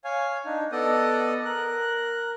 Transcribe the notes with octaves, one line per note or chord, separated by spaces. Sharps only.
C#5 F5 G#5
D4 D#4
B3 A4 D5 D#5 D#6
A#4 F#6